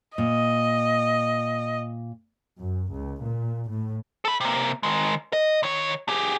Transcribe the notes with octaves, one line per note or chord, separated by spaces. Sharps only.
A#2 D#5
F#2
C#2
A#2
A2
A4 B5
C3 A#3
D#3 G#3
D#5
D#3 C#5
G4 G#4